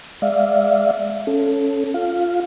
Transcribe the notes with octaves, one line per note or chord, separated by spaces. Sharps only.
G#3 D5 E5 F5
C#4 A4
F4 F5